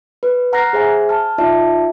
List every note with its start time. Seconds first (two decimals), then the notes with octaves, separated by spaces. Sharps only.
0.23 B4
0.53 F#5 A#5 F6 F#6 A#6 C7
0.73 G#4 C5 E5 G#5
1.09 A5 F6
1.38 D#4 F4 D5 E5 A5